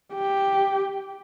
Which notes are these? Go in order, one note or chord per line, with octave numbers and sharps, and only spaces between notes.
G4